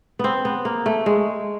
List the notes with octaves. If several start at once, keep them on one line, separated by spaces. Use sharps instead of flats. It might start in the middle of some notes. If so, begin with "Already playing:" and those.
B3 C4
B3
A#3
A3
G#3